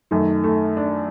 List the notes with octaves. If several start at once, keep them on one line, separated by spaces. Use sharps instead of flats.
F#2 D#3 A3
A3
D4